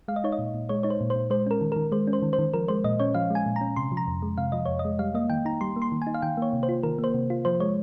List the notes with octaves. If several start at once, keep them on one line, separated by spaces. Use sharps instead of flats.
G#3 F5
D#5
D#4 C#5
D#5
A#2
A#2
G#3 C#5
D#4 C#5
C5
A#2
C5
A#2
G#3 C5
C#4 A#4
D#3
D#3 A#4
G#3 C5
C#4
C5
D#3
C5
D#3
F3 A#4
G#3 C5
A#2 D#5
C#4 C#5
F3 F5
G#3 G#5
A#2
C#4 A#5
C3 C6
F3
A#5
F2
G#3
C3 F5
F3 D#5
F2 C#5
D#5
G#3
G3 F5
A#3 D#5
D#3 G5
D#4 A#5
G3 C6
A#3
C6
D#3
G#5
D#4
F5
D#3 G5
A#3 C#5
C3
C5
F4
D#3 A#4
A#3
C5
C3
F4
F3 C5
G#3 C#5